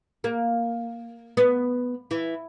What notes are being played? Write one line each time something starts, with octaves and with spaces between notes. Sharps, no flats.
A#3
B3
E3